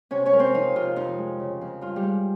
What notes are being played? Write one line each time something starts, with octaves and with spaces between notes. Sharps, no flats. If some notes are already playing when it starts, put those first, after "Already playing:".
C3 C#4 C#5
C#4 C#5
G#3 A#4
C4 C5
F3 D#4
C3 F4
F2 D#4
G#3
C#3
F2
G2 F4
G3 G4
G#3